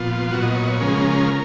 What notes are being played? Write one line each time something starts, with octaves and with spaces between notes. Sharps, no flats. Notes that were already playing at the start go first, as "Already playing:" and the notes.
Already playing: A#2 F3 B3 F4
A#2 F#3 B3 F#4
D#5
C#5
D#5
C#5
C#3 F3 G#3 C#4 A#4
G#4
A#4